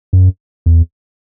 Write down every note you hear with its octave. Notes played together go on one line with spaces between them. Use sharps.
F#2
E2